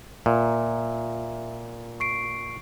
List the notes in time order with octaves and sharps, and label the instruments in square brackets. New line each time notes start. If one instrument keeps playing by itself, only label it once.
[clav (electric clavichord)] A#2 [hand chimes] E5
[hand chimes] C#6 C7 D7